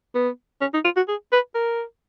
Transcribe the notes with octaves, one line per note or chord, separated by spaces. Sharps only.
B3
C#4
D#4
F4
F#4
G#4
B4
A#4